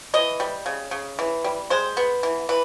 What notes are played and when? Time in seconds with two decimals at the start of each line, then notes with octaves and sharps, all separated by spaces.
0.14 E3 D#5
0.40 G3
0.66 C#3
0.91 C#3
1.19 E3
1.44 G3
1.70 G#3 C5
1.97 B3
2.23 E3
2.49 E3 B4